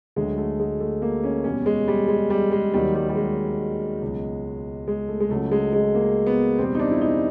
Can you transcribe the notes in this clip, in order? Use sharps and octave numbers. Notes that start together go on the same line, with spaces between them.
D2 D3 F#3 G#3
A3
G#3
A3
A#3
C#4
E2 B2 G3 C#4
G#3
G3
G#3
G3
G#3
D#2 D#3 F#3 G3
G3
G3
G#3
C#2 B2 F#3
G#3
A3
G#3
C#2 C#3 F#3 A3
G#3
G#3
A#3
B3
E2 B2 G3 C4
D#4
D4
E4
D#4